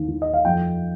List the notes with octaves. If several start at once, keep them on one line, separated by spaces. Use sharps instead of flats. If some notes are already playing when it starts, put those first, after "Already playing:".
Already playing: D#2
D#3
D#5
F5
F2 G5